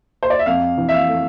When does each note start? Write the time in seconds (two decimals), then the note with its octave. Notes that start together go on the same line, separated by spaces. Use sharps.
0.23 C5
0.30 D5
0.39 E5
0.46 F2 F5
0.77 E3
0.89 E5
0.94 F5
1.09 A3